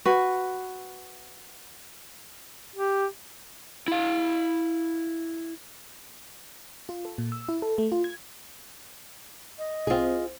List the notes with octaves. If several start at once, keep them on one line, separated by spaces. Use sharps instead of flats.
F#4 B4
G4
E4 F5
F4
A4
A#2
E6
E4
A4
A3
F4
G#6
D#5
C2 C4 F4 G#4